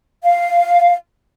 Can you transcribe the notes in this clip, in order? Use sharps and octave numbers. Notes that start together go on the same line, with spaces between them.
F5